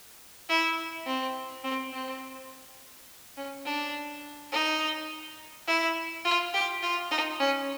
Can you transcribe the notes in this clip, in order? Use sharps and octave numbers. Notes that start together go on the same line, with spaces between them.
E4
C4
C4
C4
C#4
D4
D#4
E4
F4
G4
F4
D#4
C#4